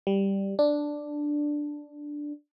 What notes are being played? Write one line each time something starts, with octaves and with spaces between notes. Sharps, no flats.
G3
D4